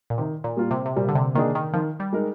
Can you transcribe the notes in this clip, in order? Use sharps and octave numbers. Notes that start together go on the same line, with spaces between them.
A#2
C3 D#3
A#2
G3 A#3 F4 A#4
C3
C3
A#2 G3
D3
C3
D#3 A#3 D4 G#4
D#3
D#3 F3
G3
G#3 D#4 A#4